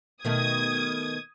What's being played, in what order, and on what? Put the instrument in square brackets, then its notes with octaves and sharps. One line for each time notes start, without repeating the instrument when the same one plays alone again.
[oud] B2 D#3 A3 [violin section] D#6 G#6